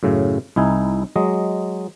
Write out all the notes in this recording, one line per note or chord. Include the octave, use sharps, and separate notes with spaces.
F#2 A2 C#3
C2 D#4 E4 G#5
F#3 G#3 D#5